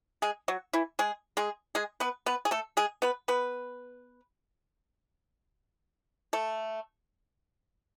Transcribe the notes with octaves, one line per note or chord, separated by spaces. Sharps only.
G#3 G#4
F#3 F#4
E3 E4
G#3 G#4
G#3 G#4
G#3 G#4
B3 B4
B3 B4
G#4
A3 A4
G#3 G#4
B3 B4
B3 B4
A3 A4